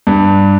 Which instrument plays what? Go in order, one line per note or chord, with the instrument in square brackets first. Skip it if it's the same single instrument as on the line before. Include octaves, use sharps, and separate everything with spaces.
[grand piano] G2